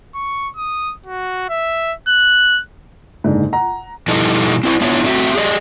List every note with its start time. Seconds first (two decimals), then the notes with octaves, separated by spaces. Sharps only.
0.15 C#6
0.57 D#6
1.06 F#4
1.50 E5
2.08 F#6
3.24 F#1 G#2 D3
3.53 F#5 A#5
4.08 B2 F3 G3 D#4 E4 A4
4.63 C4 E4 C5
4.81 B3 D4 E4 F4 C#5
5.04 A3 C4 F#4 E5
5.35 G4 G#4 D5 D#5